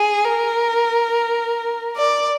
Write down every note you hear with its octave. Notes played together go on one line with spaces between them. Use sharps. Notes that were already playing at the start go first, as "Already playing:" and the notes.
Already playing: G#4
A#4
D5